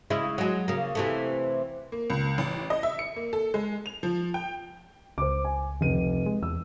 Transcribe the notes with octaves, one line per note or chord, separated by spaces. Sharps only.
C#3 G#3 E4
F#3 G#3
C#3 A#3
C3 E3 A3
A#3
C#2
A1
D#5
E5
C#7
A#3
A4
G#3
F7
F3
G5
C#2 C5 D6
G#5
F1 D#7
G#3
E2 E6